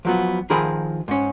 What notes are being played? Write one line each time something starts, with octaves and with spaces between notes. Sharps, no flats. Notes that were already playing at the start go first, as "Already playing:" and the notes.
F3 F#3 B3
D#3 F3 G#4 A#4 B5
G#2 C#4